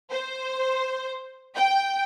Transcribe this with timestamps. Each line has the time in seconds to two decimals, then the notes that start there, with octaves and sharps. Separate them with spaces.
0.11 C5
1.55 G5